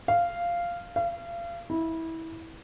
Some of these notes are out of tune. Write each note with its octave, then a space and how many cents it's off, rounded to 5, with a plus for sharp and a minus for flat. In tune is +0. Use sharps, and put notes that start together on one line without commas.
F5 -10
F5 -35
E4 -20